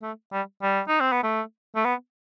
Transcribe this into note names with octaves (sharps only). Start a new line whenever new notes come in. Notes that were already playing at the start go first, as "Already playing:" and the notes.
A3
G3
G3
D#4
C4
B3
A3
A3
B3